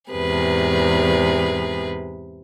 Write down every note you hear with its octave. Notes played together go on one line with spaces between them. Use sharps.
E2 G#2 C3 G#4 B4